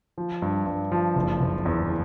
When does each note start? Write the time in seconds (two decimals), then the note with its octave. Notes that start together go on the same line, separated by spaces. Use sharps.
0.18 F3
0.42 G2
0.66 G2
0.92 F3
1.15 F#1
1.40 F#1
1.65 E2